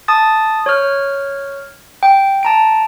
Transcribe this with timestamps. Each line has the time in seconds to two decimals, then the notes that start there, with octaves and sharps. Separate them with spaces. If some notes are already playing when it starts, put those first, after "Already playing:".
0.08 A5 D#6 A6
0.66 C#5 C#6 F6 G6
2.03 G5
2.43 A5 A#5 D7